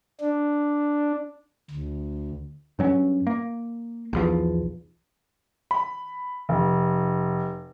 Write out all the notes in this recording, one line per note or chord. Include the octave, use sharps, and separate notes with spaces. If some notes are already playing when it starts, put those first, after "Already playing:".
D4
D2
G2 F#3 C4 C#4
A#3
B1 E2 F3
B5
F1